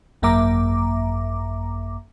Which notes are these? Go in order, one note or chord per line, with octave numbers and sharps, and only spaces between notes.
G#1 F#2 A#3 E5 A#5 D6